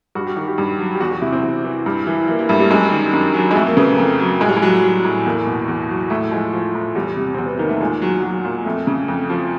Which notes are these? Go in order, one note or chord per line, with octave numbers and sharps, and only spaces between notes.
G2 F#4
G4
D#3 F#4
G4
G2
F#3
G4
E2 F#4
F#4
C3 E4
C4
E2
E3
G2
E3
E3 A#3
A#3
G2 A3
G3
F#2 G#3
D#3
F#2
F#3
G#3
F2 A3
A#3
C#3 B3
A#3
F2
F#3
A2 G#3
G3
G#3
F#3
F#3
A2
E2 A#3
B2
E2
F#3
A2 A3
F3 G#3
F3
A2
E2 G3
C3
E2 C4
B3
D#3 A#3
A3
A#2 G#3
F#3
F#3
A#2
F2 A3
C#3
F2
F3